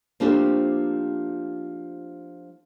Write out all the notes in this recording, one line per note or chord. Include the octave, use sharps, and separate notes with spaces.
F3 A3 A#3 C4 D4 G4